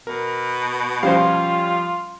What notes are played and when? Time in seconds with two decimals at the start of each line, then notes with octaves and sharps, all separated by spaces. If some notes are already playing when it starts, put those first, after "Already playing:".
0.07 B2 A#4
1.03 F3 G3 C#4 F4 C5 F5 C7